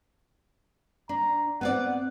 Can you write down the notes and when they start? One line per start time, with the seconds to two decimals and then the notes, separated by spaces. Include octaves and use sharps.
1.09 D4 A#5
1.61 B3 C4 D5 F#5